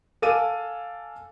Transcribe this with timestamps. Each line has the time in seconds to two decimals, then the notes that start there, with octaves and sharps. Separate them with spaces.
0.22 A4 F5 G#5 D6 D#7